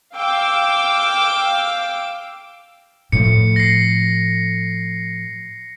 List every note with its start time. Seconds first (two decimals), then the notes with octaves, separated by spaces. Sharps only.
0.15 F5 G5 D6 E6
3.12 A2 F3 C#7
3.56 A#6 C7